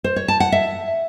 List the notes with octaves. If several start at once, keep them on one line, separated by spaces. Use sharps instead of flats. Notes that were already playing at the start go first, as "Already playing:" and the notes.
C5
C#5
A5
F#5
E5